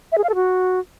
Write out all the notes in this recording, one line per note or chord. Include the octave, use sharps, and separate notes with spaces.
E5
G#4
F5
A4
F#4